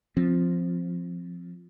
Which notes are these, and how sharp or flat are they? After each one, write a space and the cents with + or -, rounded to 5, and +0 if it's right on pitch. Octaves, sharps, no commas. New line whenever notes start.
F3 +0 C4 +0